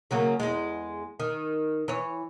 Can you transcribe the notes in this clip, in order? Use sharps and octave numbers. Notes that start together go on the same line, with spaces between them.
C#3 F#3 A#3
E2 G#3
D#3
E3 C#5